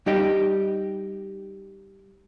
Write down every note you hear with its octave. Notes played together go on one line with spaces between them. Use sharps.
G3 D#4 G4 D#5 G5